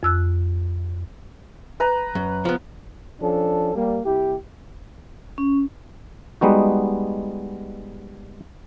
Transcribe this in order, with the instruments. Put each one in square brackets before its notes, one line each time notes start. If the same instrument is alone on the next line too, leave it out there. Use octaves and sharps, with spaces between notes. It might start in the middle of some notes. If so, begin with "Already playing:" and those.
[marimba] F2 E6 F#6
[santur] B4 A#5
[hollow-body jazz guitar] F#2
F3 B3
[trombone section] F3 C#4 D4 A4
G3 A#3
C2 E4 G4
[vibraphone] C#4
[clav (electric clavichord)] G3 G#3 B3 D#4 F#4